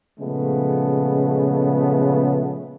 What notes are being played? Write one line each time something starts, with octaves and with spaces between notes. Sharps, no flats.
A#2 C#3 F3 G#3 A3 B3